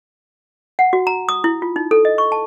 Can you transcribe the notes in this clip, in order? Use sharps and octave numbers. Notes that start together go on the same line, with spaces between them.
F#5
F#4
A#5
D#6
E4
F4
D#4
A4
D#5
C#6
A5